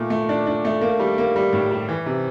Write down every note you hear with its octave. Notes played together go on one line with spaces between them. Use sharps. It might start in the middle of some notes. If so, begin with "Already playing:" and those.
Already playing: A#2 A3
A3
D4
D4
A3
A#3
G3
A#3
G3
A2
G3
E3
C3